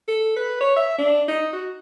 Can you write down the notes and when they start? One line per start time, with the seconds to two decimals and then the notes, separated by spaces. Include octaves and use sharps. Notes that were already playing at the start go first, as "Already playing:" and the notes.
0.08 A4
0.36 B4
0.60 C#5
0.76 E5
0.98 D4
1.28 D#4
1.53 F#4